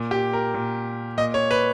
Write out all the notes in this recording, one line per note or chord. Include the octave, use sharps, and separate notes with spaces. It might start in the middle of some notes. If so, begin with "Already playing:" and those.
Already playing: A#2
G4
A#4
A#2
A#2 D#5
C#5
B4